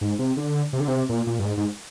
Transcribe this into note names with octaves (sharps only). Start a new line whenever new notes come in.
G#2
C3
D3
C3
D3
C3
A#2
A#2
G2
G#2
G#2